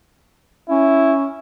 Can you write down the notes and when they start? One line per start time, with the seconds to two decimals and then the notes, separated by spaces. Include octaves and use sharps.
0.70 C#4 E4